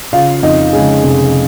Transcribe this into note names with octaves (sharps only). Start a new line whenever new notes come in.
C#3 F4 F5
F2 D#4 D#5
C#3 G#3 G#4
F1